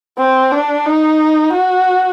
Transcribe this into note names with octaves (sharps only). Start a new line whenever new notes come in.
C4
D4
D#4
F#4